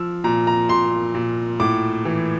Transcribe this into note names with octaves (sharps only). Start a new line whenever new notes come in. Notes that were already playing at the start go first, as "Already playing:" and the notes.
Already playing: F3 E6
A#2 A#5
A#5
A#2 C6
A#2
A2 D6
E3